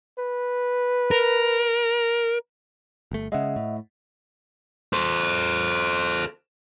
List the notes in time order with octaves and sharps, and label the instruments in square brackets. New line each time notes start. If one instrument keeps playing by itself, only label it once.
[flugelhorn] B4
[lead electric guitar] A#4
[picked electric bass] G1 A3
[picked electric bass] C#3 G#3 [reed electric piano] D#5 E5 F#5
[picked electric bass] A2
[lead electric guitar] A4 C5